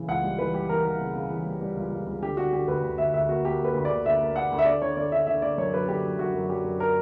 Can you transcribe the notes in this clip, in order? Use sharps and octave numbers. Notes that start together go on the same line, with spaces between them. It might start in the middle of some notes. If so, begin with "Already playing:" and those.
Already playing: C#3 E3
C#2 F#5
G3
E3 B4
G3 G4
E3 A#4
E3 A#4
C#3
C#3
E3
G3
G3
C#2
C#2
C#2
D3 G4
D3 F#4
D3 G4
D2 B4
D2
D2 E5
D2 E5
A#3 F#4
A#3 G4
A#3
B4
D2
D5
D2
D2 E5
A#3
A#3 F#5
D2
E5
D3 D5
D3 C#5
D3 D5
D3 E5
D3 E5
D3 D5
F#2 C#5
F#3 B4
D3 G4
F#3
F#2 F#4
F#2
F#3 G4
F#2
A#4